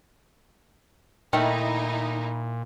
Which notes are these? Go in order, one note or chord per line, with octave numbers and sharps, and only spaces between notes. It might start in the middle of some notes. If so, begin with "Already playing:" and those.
A#2 D#3 A3 D#4 E4 G5